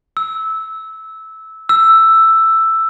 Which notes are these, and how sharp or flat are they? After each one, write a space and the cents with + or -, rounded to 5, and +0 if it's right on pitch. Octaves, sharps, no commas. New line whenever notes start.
E6 -15
E6 +5